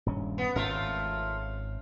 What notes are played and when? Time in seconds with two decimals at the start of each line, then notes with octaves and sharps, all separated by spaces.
0.06 D#1 G2 C#4
0.38 B3
0.56 G#1 G#2 A3 C#4 F4 A#4